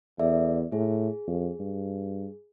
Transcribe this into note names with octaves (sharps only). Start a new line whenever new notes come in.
E2 A4 D5 E5
A2 G#4
F2
G2